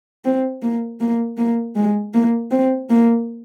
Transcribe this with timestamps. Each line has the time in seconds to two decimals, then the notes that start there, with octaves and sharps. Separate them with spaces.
0.25 C4
0.62 A#3
1.00 A#3
1.37 A#3
1.76 G#3
2.14 A#3
2.51 C4
2.90 A#3